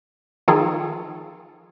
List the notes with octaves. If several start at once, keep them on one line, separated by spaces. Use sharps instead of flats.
D#3 F3 F4 G#4 A4